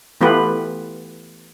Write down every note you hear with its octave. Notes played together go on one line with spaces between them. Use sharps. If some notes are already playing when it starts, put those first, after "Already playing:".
E3 A3 B3 F4 G4 B4